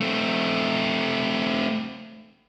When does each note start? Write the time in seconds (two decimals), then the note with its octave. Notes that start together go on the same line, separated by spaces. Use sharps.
0.01 A3 C4